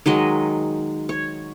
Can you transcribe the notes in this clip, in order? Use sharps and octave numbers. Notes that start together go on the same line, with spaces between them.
D#3 F#3 G#3 D#5
C#5